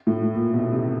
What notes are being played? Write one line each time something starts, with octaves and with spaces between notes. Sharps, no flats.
A2
A#2
B2
C3